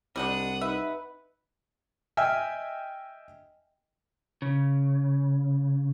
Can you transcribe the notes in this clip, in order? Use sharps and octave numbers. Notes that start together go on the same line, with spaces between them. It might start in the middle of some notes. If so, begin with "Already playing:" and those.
C2 G3 G#3 D4 F#5 D#6
D#4 B4 E5
D#5 E5 G5 G#5 E6 F6
C#3